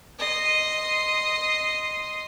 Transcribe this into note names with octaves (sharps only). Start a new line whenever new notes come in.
D#5 C6